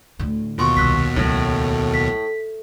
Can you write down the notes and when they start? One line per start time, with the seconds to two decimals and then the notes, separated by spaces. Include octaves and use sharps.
0.19 D2 A2
0.58 D#2 B2 F4 C6 C#6
0.77 C2 D#3 E6 F#6 B6
1.16 C#2 A2 F#3
1.94 B6